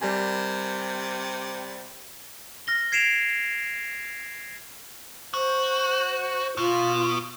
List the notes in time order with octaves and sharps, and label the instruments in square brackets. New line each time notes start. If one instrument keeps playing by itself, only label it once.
[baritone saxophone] C3 [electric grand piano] G3 A#4 G#5
[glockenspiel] F6 A#6 G7
G#6 C7 D7 E7 F7
[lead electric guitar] F#4 [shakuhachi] C5
[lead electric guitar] B2 [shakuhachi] F4